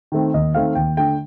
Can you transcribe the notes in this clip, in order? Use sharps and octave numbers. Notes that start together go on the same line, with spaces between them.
D#3 A3 C4
D#2 D#5
D#3 A3 C4 F5
D#2 G5
D3 A3 G5